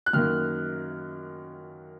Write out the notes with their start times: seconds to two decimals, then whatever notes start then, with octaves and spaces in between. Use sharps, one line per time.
0.06 F#6
0.13 F#2 D#3 A#3 F6